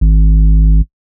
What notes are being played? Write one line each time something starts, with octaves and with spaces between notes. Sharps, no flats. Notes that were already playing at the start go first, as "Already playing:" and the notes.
G#1